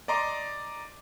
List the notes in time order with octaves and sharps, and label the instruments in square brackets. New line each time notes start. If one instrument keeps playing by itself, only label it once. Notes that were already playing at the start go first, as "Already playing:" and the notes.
[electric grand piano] D5 D#5 A#5 C6 D6